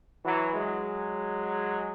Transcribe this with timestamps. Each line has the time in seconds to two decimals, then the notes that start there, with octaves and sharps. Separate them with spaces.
0.24 E3 F#3
0.54 F#3 G#3